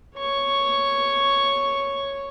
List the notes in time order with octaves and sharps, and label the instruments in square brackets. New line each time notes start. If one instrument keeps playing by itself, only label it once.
[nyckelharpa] C#5 C#6